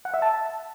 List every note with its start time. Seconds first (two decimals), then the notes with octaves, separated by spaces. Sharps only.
0.05 F#5
0.14 E5
0.22 A5